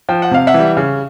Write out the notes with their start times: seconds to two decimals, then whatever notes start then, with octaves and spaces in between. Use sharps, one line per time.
0.09 F3 G5
0.22 F#5
0.31 C3 F5
0.47 E5 F#5
0.54 E3 G3
0.77 C#3